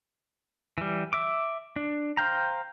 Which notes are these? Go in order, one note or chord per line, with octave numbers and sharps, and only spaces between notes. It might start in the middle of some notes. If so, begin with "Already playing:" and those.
E3 G3
E5 D6
D4
C5 F5 G5 A#5